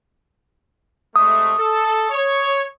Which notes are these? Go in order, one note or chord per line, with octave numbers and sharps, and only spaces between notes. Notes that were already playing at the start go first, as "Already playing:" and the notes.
C3 G#3 A3 D#6
A4
C#5